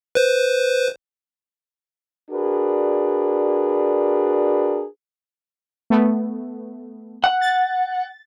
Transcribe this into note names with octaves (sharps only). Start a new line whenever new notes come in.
B4 C5
D4 F#4 G#4 A#4 B4 D5
A3 B3
F#5
A6